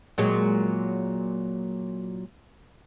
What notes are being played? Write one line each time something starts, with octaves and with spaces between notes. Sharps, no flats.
A#2 F#3 G#3